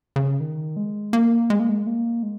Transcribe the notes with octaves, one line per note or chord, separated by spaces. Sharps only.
C#3
D#3
G#3
A#3
G#3
A#3
G#3
A#3
G#3